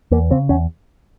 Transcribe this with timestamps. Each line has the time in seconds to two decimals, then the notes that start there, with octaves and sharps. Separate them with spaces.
0.11 E2 A#3
0.31 C#3 C4
0.49 E2 C#4